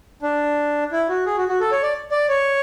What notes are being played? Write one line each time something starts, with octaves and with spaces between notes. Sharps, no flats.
D4
E4
F#4
G#4
F#4
F#4
A4
C#5
D5
D5
C#5